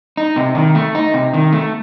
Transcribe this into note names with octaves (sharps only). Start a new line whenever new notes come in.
D#4
C3
D#3
A3
D#4
C3
D#3
A3